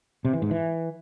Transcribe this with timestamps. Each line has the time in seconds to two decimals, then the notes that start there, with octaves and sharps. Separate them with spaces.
0.25 C3
0.33 E3
0.42 G#2
0.51 E3